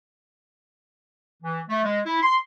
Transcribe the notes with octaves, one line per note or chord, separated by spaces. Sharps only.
E3
A3
G#3
E4
C6